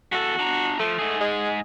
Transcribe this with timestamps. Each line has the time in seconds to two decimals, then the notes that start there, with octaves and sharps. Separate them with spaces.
0.12 E2 F#4 A4
0.39 D4 A#5
0.79 F3 A3
0.99 G#2 G#4
1.20 G#3